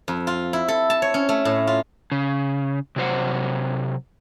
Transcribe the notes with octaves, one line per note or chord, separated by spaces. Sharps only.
F2
F4
E4
A4
A5
C#5
C#4
A3
A2
F4
C#3
C3 F#3 C5 F#5